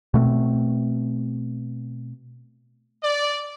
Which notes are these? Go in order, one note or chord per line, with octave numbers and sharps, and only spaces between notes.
B2 A3 A#3 C4
D5